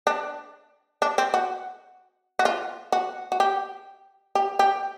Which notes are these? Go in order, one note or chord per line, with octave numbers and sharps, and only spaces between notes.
D4
D4
C4
F#4
F#4
F4
F#4
F#4
G4
G4
G4